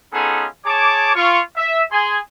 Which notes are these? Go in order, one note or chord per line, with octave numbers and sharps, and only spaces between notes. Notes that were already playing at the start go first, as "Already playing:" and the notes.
B3 C#4 D#4 F4 G#4 A4
G#4 C#5 A5 D6
F4 C#6
E5
G#4 G#5 C6